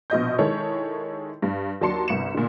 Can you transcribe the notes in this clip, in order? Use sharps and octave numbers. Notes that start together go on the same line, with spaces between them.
A#1 B2 D#5 G6
D#3 G#3 E4 A4 C#5
G2
D#2 F#3 D4 A5 C6 C#7
G1 C2 C#7 E7
A#2 D3